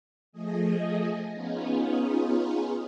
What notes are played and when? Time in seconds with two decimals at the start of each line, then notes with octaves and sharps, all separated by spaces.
0.32 F3 A3 G#4 D#5
1.31 B3 C#4 D#4 F4 G#4